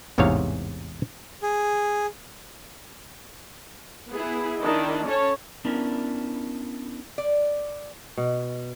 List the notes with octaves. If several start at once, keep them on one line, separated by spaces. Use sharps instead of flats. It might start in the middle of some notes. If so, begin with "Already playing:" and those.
A1 E2 G#2 C3 C#5 F5
G#4
B3 E4 G#4
D#3 D4 E4 D#5
C#4 A4 C#5 A5
B3 C#4 D4 E4 A#4
D5
B2